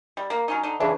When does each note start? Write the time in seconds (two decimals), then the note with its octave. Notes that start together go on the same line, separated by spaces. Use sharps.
0.17 G3
0.30 A#3
0.48 F#3 C#4 D#4
0.63 D3 D#4
0.80 C#3 E3 D4